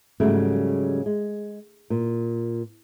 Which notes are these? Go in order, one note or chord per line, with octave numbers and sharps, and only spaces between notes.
G#2 C#3 F#3 G3 A3
G#3
A#2